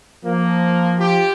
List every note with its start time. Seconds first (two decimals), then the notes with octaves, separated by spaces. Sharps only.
0.25 F3 A#3
0.99 F4 G4